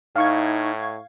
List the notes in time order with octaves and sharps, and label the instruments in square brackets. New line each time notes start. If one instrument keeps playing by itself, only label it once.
[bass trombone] A2 [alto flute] D#4 [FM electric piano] F5 C#6 G#6